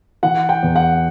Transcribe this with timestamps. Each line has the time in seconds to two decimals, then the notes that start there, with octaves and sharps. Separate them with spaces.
0.23 E3 F#5
0.49 G5
0.63 E2
0.76 F#5